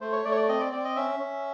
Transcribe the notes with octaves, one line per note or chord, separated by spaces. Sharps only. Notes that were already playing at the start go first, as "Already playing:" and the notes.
A3 C5
C#5
A3 D5
C#5
D5
C4 D#5
D5
C4 D5
D#5
C#4 E5
C#4